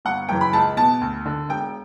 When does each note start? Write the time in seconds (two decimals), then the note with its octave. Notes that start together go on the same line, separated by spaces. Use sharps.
0.05 G1 F#5
0.29 F#2 C#3 E3 G5
0.41 B5
0.53 C#2 A5
0.77 B2 A5
1.01 D2
1.26 D3
1.49 E1 G5